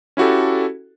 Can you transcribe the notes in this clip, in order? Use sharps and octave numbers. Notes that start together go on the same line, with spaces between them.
C#4 E4 F#4 G4 A4